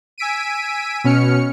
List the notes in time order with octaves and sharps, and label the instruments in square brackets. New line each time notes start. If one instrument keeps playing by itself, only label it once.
[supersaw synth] G#5 E6 B6 D7 D#7
B2 C#4 F6 C#7